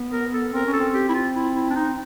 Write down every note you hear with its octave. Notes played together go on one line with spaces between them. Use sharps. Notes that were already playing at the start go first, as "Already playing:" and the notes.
Already playing: B3
A#4
A4
C4 A#4
C#4
A4
C4
G4
E4
F4
E4
E4
D4
D#4